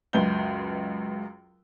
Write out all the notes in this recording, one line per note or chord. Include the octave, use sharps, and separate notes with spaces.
C#2 F#2 G#3 B4 G6 G7